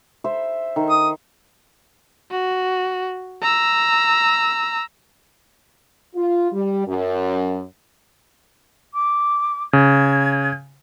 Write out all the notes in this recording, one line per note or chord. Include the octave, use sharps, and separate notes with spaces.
C5 E5
D#3
D#6
F#4
A#5 E6
F4
G3
F#2
D6
C#3 G#6